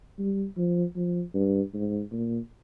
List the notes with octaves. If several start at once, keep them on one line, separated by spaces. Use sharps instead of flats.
G3
F3
F3
G2
G#2
A#2